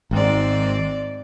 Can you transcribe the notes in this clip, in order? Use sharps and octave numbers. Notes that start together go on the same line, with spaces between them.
G#1 G#2 C4 D5